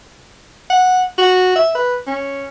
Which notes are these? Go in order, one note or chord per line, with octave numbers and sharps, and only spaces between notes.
F#5
F#4
E5
B4
C#4